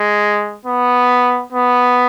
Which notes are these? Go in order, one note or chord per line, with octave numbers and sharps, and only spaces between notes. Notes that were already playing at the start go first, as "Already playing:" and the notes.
Already playing: G#3
B3
B3